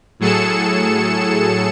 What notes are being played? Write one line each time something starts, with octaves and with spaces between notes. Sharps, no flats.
A2 F#3 G#4 A4 C#7 E7